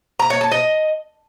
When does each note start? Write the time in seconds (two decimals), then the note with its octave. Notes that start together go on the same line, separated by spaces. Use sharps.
0.20 A#5
0.30 C#5
0.41 A5
0.52 D#5